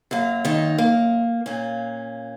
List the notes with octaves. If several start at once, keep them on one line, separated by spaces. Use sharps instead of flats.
F#2 F#3 A#3
D#3 D#4
A#3
A#2 A#3 C#4